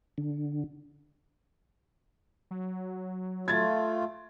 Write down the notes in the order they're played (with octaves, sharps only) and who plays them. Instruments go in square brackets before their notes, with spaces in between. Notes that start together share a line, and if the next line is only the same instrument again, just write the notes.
[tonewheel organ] D3
[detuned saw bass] F#3
[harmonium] A3 F4 [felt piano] G#6 A6